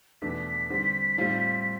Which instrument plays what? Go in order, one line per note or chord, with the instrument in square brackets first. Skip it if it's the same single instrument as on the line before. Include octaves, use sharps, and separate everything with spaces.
[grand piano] E2 B2 A3 D4 [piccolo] B6
[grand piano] D3 G3 C4
A2 G3 C4 F4